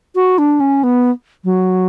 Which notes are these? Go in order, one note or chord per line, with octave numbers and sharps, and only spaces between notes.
F#4
D4
C#4
B3
F#3